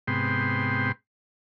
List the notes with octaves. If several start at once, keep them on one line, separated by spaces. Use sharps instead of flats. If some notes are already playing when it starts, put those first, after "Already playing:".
G#2 C3 B3 G5 C6